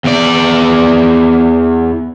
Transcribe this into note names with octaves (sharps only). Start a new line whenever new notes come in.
E2 D5